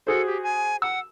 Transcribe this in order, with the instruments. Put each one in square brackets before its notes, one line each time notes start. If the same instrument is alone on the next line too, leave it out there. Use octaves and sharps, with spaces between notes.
[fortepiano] F#4 G#4 C5 [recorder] A4
[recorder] G4
G#5
[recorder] F#5 [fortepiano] E6